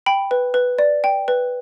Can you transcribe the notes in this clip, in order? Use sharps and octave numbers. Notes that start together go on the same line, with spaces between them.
G5 B5
B4
B4
D5
G5
B4